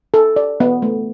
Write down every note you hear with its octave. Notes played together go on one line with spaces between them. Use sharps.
A4
D5
B3
A3